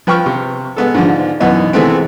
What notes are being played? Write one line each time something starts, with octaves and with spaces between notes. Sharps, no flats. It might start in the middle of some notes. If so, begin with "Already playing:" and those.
F3 B4 G5 C#6 F6
C3
G#3 B3 A4
G#2 D3 F3
F#2 B2 E3 B3 D#4
C3 E3 G#3 A3 B3 C4